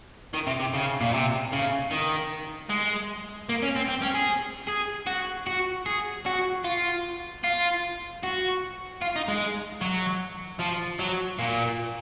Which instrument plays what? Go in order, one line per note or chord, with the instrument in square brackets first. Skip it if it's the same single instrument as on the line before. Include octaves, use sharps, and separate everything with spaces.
[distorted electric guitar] D#3
C3
C3
C#3
A#2
C3
C#3
D#3
G#3
A#3
C#4
C4
C4
C#4
G#4
G#4
F#4
F#4
G#4
F#4
F4
F4
F#4
F4
D#4
G#3
F#3
F3
F#3
A#2